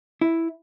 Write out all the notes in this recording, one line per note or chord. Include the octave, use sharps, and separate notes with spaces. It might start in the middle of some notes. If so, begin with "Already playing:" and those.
E4